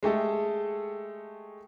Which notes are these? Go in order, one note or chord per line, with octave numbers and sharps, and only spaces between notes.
G#3 A3 G4 A4